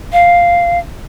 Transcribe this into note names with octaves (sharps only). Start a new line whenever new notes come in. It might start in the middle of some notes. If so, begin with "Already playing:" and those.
F5